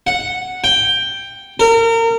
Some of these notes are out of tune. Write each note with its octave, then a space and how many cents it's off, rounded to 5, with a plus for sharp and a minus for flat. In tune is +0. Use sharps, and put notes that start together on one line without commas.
F#5 -5
G5 +5
A#4 -30